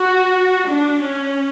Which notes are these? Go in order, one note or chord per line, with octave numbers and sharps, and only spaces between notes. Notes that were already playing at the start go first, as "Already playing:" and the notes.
Already playing: F#4
D4
C#4